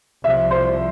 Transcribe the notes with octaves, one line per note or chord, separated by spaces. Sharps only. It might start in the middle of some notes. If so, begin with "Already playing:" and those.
C2 C3 F3 E5
C5